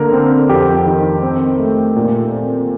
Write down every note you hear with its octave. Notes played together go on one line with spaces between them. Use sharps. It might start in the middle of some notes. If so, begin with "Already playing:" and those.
Already playing: D3 A#3 A#4
C4
F2 G4
D#3
C4
A3
A#2
C4